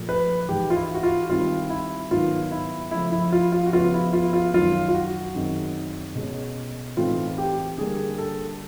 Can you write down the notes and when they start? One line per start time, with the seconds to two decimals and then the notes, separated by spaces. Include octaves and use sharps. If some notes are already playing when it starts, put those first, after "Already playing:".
Already playing: A#2 F3 A3
0.09 B4
0.49 G#2 E3 G#3 G4
0.70 F4
0.76 E4
0.94 F#4
1.03 F4
1.30 D#3 G3 C4 E4 F4
1.70 E4
2.11 G#2 D#3 F#3 B3 E4 F4
2.51 E4
2.91 C#3 F3 A3 E4
3.12 E4
3.32 F4
3.52 F4
3.66 F#4
3.73 C#3 F3 G#3 B3 E4 F4
3.94 E4
4.13 F4
4.24 E4
4.33 F4
4.54 F#2 D#3 F#3 F4
4.88 F4
4.94 F#4
5.35 F#2 D#3 G#3 C4 D#4
6.16 B2 G#3 C#4
6.97 A2 E3 A3 C4 D#4 F4
7.38 G4
7.78 D3 G3 A#3 D4 G#4
8.18 A4